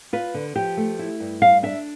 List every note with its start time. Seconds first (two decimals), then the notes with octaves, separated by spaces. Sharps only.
0.13 F4 B4
0.34 D3
0.56 F3 G4
0.77 A3
0.99 E4
1.20 G2
1.42 G3 F5
1.63 D4 E5